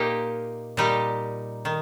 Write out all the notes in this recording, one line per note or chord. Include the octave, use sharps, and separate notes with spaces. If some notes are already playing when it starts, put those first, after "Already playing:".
Already playing: A#2 A#3 D#4 G4
A#2 G3 D#4 G4
D#3